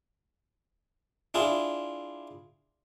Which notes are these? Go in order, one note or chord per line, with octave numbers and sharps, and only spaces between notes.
D4 E4 F4 G#4